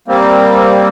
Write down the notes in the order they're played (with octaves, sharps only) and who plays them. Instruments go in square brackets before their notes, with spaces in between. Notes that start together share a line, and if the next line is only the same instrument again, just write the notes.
[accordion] G3 A#3 C4